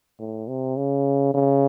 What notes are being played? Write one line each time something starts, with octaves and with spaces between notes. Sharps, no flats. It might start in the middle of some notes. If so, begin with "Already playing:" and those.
A2
C3
C#3
C#3